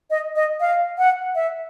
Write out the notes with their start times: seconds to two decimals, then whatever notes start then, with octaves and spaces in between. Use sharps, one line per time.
0.10 D#5
0.36 D#5
0.60 F5
0.98 F#5
1.35 E5